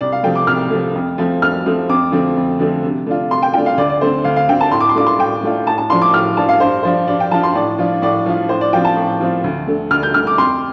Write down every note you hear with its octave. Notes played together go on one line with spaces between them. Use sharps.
C2 D5
F5
C3 F3 A3 G5
D6
C2 F6
C3 F3 A3
F2
F3 A3 C4
F2 F6
F3 A3 C4
F2 D6
D3 F3 A3 C4
F2
D3 F3 A3 C4
C3
A3 D4 F4
C3 C6
G5
A3 D4 F4 G5
F5
D2 D5
D5
D3 A3 C4 C5
D2 F5
F5
D3 A3 C4 G5
A5
A2 C6
D6
C6
A3 D4 F4 D6
C6
A2 G5
A3 D4 F4
A2 A5
A5
F3 D4 F4 C6
D6
A2 F6
F3 D4 F4 A5
F5
G2 C5
F3 D4 F4 C5
G2 D5
G5
F3 D4 F4 A5
C6
A2 D5
F3 D4 F4
A2 D5
F3 D4 F4
A2 C5
D5
F3 C4 F4 G5
A5
A2
F3 C4 F4
D2
D3 A3
D2 F6
G6
D3 A3 F6
D6
F2 C6